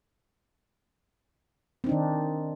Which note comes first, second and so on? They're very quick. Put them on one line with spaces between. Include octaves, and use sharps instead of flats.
C4 D#4 D4 D#3